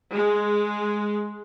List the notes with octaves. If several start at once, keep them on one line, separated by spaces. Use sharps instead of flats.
G#3